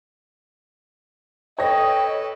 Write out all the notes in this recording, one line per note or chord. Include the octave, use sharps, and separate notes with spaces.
A4 B4 C#5 D#5 G5 A#6